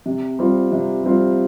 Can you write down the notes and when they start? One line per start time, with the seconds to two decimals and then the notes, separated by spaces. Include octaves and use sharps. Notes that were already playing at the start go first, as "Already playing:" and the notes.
0.06 C3
0.39 G3 C4 F4
0.72 C3
1.04 G3 C4 F4